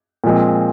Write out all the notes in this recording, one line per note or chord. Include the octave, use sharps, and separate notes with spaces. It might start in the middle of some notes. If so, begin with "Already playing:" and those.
A#2 F3 G#3 C4